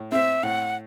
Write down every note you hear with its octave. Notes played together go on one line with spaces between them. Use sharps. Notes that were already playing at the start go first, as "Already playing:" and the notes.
Already playing: A2
C4 E5
A2 F#5